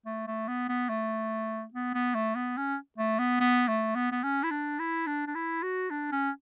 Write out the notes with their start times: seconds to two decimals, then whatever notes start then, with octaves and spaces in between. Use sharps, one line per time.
0.06 A3
0.27 A3
0.48 B3
0.69 B3
0.89 A3
1.74 B3
1.94 B3
2.15 A3
2.35 B3
2.57 C#4
2.98 A3
3.19 B3
3.41 B3
3.68 A3
3.95 B3
4.12 B3
4.24 C#4
4.43 E4
4.51 D4
4.79 E4
5.07 D4
5.27 D4
5.35 E4
5.63 F#4
5.90 D4
6.12 C#4